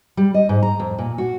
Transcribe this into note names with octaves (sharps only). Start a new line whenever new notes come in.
G3
D#5
G#2
A#5
F2
A#2
F#4